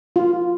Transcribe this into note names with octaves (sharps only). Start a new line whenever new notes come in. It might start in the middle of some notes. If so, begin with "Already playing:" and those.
F4